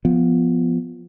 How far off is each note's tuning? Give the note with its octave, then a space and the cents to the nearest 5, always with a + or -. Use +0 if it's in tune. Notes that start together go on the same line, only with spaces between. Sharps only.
F3 +0 B3 +0